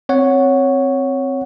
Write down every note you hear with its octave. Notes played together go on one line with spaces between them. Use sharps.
C4 C#5 F#5